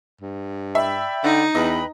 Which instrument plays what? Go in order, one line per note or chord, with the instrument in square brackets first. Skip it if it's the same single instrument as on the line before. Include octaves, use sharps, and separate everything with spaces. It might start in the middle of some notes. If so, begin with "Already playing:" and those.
[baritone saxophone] G2
[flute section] D5 G5 B5 [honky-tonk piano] E5
[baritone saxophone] D3 [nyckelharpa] D#4
[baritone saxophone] E2 [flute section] B4 G5 B5 [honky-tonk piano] D#5